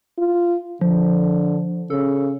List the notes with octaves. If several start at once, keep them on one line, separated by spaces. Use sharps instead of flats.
F4
D3 F3
C#3 A4